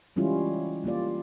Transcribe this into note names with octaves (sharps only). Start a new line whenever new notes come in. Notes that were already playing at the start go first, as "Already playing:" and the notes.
E3 G3 G#3 C#4 E4 F4
G3 A#3 F4 D5